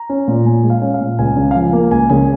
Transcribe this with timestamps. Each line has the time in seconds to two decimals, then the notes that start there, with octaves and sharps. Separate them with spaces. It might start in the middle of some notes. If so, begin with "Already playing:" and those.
Already playing: A#5
0.09 C#4
0.28 A#2
0.46 A#2 G#5
0.63 G#3
0.70 F5
0.82 C#4
0.94 F5
1.01 A#2
1.19 C#2 G#5
1.36 C#3
1.51 F5
1.55 F3 G#5
1.73 A#3
1.91 C#2 G#5
2.10 C#3 G#5